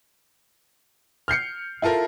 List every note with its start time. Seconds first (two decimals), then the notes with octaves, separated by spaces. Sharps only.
1.28 F6 G6 C7 C#7
1.82 E4 F4 A4 A#4